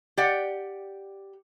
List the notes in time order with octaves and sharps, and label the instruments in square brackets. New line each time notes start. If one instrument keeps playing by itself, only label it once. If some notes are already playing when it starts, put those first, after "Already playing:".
[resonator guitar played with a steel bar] G4 D5 F#5